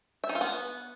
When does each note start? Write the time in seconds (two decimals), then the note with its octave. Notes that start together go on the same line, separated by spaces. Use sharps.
0.24 E5
0.29 D#4
0.35 F4
0.41 B3